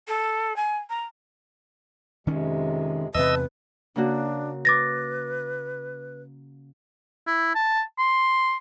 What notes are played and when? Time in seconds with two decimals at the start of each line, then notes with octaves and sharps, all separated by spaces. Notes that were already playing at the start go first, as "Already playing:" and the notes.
0.07 A4
0.56 G#5
0.89 A#5
2.27 F2 C3 D#3 G#3 C#4
3.15 E2 C3 B4 D#5 E5 A5 E6
3.96 C#3 A#3 D4 F#4
4.65 B4 D6 A6 A#6
7.27 E4
7.55 A5
7.99 C6